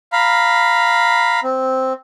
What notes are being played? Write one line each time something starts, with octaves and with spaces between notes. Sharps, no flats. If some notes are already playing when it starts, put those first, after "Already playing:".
F5 A#5 B5
C4